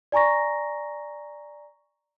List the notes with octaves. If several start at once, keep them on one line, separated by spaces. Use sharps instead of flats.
D5 G#5 A#5 C#6 A#6